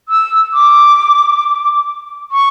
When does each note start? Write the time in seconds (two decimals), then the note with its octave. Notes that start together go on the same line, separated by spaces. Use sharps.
0.09 E6
0.54 D6
2.32 C#6